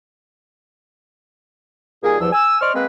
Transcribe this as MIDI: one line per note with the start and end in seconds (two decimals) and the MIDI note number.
2.03 2.18 46
2.03 2.18 51
2.03 2.18 55
2.03 2.18 58
2.03 2.18 68
2.20 2.32 40
2.20 2.32 43
2.20 2.32 53
2.20 2.32 88
2.33 2.60 80
2.33 2.60 88
2.61 2.74 72
2.61 2.74 74
2.61 2.74 75
2.61 2.74 84
2.61 2.74 85
2.61 2.74 89
2.75 2.86 56
2.75 2.86 58
2.75 2.86 60
2.75 2.86 71